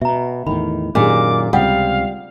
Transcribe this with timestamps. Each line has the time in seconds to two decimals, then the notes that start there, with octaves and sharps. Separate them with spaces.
0.01 B2 E5 A#5
0.47 E2 A2 D#3 B5
0.95 F#2 A#2 D#3 D4 G4 G#4 D6
1.53 C#2 C3 G3 F4 F5 F#5 D#6